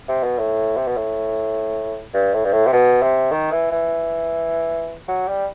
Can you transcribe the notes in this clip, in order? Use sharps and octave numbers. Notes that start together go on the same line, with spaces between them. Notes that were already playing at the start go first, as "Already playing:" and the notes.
C3
B2
A2
C3
B2
A2
G2
A2
G2
A2
C3
B2
C3
D#3
E3
E3
F#3
G3